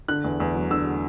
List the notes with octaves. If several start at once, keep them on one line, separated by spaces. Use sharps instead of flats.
D3 F#6
E2
E2
F#3
D3 E6